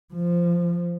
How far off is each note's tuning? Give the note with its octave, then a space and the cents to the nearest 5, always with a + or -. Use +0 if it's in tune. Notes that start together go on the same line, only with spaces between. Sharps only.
F3 -10